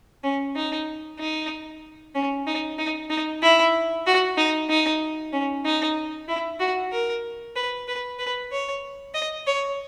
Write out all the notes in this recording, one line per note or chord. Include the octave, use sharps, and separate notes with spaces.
C#4
D#4
D#4
C#4
D#4
D#4
D#4
E4
F#4
D#4
D#4
C#4
D#4
E4
F#4
A#4
B4
B4
B4
C#5
D#5
C#5